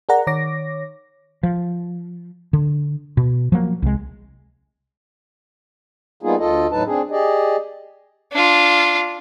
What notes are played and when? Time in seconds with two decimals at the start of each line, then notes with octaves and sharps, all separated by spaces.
0.09 G#4 A#4 D5 F#5 A#5
0.27 D#3 C#5 D6 A#6
1.43 F3
2.53 D3
3.17 B2
3.52 F3 F#3 A#3
3.82 C2 G#3
6.23 G3 A#3 B3 D#4 F4 G#4
6.39 D2 F4 A4 D#5
6.72 E2 A2 F#3 D#4 B4 A5
6.87 C4 D4 G#4
7.11 G4 G#4 D5 D#5
8.32 D4 F4